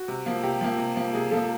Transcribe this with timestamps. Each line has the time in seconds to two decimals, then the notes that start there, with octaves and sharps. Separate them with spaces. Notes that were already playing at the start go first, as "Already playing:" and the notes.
Already playing: F#4
0.08 C3
0.26 F3 A#3
0.43 C3 G4
0.61 F3 A#3
0.78 C3
0.96 F3 A#3
1.13 C3 G#4
1.31 F3 A#3 A4